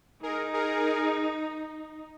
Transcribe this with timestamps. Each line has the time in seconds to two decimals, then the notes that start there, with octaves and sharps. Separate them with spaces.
0.23 D#4 G#4 A#4
0.53 G#4 A#4